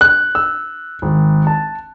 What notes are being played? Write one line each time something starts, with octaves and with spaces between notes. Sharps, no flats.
F#6
E6
G#1
A5